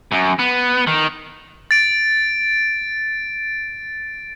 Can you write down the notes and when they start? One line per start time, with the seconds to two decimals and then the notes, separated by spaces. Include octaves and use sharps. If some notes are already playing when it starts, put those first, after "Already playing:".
0.12 F#2
0.39 B3
0.87 D#3
1.71 A6 D7